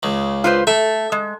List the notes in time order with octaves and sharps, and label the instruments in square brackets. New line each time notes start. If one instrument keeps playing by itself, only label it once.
[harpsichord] C#2 C#3
[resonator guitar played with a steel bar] F4 B4 C5
[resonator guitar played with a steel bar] A3 [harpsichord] E5
[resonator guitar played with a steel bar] G#3